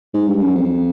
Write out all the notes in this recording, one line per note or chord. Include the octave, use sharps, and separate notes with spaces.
G#2
G2
F#2
F2